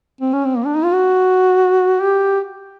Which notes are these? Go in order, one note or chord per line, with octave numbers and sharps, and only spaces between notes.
C4
C#4
C4
A#3
D4
D#4
F4
F#4
G4